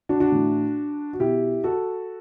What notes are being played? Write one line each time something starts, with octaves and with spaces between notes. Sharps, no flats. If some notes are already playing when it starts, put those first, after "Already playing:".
D4 F#4
D4 F#4
A2 E3
F#4
B2 E4 G4
F#4 A4